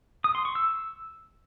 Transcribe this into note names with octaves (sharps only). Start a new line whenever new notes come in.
D#6
C6
C#6
E6